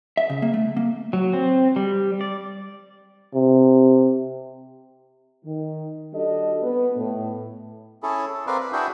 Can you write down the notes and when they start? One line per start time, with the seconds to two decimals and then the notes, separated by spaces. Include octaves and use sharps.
0.17 E5
0.30 C#3
0.42 A#3
0.54 A3
0.77 A#3
1.13 F#3
1.33 C4
1.76 G3
2.21 D5
3.34 C3
5.44 D#3
6.13 G3 D4 F#4 A4 D#5
6.62 B3
6.97 A2
8.03 C#4 E4 G#4 A4
8.34 A4
8.47 C4 A#4 B4 D5 F5
8.61 B4
8.73 D4 E4 F#4 G#4 E5 G5